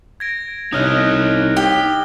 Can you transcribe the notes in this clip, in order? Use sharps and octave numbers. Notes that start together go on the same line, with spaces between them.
G#6 A#6 D7
C2 D#4 C#5 D#5 D#6 F6 F#6
G4 G7